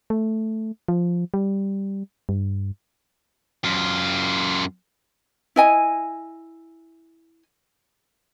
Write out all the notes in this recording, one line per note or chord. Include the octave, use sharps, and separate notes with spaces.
A3
F3
G3
G2
F#2 F4
E4 D#5 G#5